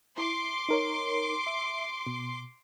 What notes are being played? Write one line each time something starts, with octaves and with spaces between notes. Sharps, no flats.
E4 C6 D6
D#4 A#4 C#5
E5
B2